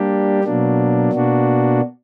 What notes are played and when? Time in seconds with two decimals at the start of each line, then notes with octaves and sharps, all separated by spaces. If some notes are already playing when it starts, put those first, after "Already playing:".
Already playing: G3 A#3 D4 G4
0.44 B2 F#3 A#3 D4
1.12 B2 A#3 D4 F#4